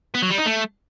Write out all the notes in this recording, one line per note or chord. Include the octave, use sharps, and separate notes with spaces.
B3
F#3
G3
D#4
A3